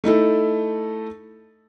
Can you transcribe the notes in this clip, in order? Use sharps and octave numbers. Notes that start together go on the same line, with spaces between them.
A3 D#4 E4 A4